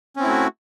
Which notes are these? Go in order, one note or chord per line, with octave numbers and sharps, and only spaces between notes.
A3 C4 C#4 E4 F#4